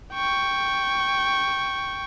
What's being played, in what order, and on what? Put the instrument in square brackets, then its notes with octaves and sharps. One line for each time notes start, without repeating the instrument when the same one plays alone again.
[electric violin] G5 C#6